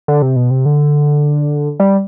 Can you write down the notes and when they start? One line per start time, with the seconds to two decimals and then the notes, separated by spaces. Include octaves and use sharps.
0.08 D3
0.22 C3
0.36 B2
0.51 C3
0.66 D3
1.80 G3